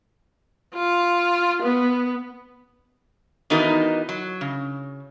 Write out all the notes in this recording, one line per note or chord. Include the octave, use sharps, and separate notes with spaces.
F4
B3
D#3 E3 B3 D#4 F#4 A#4
F#3
C#3